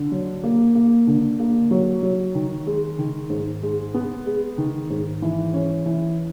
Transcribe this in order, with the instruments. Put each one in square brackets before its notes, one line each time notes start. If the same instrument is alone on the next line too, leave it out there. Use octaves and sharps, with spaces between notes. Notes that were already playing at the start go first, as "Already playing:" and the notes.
Already playing: [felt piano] D3
F#3
A#3
A#3
D3
A#3
F#3
F#3
D#3
G#3
D#3
G#2
G#3
B3
G#3
D#3
G#2
E3
C#4
E3